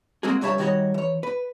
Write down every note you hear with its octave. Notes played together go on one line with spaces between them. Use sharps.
G#3 A#3 C4 F#4 G#4
C#2 G2 G3 C#5 E5 A5
D#3 G3 F#4 C5 C#5 D#5
E3 C#5
B4